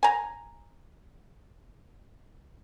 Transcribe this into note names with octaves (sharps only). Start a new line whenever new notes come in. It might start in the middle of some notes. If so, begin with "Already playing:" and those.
G#5 A#5